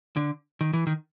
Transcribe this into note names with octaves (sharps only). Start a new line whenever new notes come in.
D3
D#3
E3
D#3